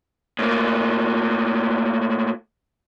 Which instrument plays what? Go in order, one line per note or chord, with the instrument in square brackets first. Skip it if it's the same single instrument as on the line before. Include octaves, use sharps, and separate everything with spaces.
[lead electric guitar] A2 A#3